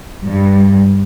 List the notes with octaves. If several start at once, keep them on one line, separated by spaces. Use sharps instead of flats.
G2